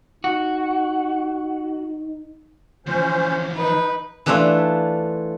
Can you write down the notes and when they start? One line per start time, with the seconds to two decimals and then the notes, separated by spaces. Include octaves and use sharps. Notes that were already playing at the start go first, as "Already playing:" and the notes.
0.24 D#4 F#4
2.86 E3 F3 C#4 C5
3.55 D#4 B4
4.26 E3 A3 D4 F4 E5